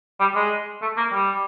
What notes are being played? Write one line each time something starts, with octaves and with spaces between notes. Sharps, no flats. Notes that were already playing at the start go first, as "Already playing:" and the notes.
G3
G#3
A3
A#3
G3